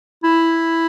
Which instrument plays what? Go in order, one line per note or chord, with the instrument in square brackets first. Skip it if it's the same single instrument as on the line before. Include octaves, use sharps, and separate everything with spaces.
[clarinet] E4